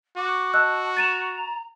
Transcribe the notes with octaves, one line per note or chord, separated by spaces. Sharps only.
F#4 D6
D#5 A5 E6 F#6
A#5 A6 D#7 E7